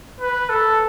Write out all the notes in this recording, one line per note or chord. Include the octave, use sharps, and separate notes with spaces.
B4
A4